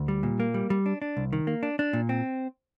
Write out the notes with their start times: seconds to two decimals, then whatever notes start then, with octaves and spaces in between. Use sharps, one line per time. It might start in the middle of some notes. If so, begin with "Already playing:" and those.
Already playing: D2
0.08 G3
0.23 A#2
0.40 A#3
0.54 G3
0.70 G3
0.86 D4
1.02 D4
1.17 C2
1.33 D#3
1.47 A#3
1.63 D4
1.79 D4
1.93 A#2
2.09 C4